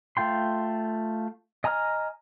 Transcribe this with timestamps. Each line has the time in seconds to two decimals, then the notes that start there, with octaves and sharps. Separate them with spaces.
0.17 A3 F4 G5 C6
1.64 D#5 G#5 A#5 D#6 F6